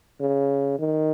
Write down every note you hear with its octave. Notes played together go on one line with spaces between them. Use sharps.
C#3
D#3